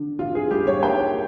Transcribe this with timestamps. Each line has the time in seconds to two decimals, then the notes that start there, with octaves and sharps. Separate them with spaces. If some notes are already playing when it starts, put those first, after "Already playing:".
Already playing: D3
0.19 D3 F4
0.35 G#4
0.51 G3 G4
0.67 C#5
0.83 A#3 G5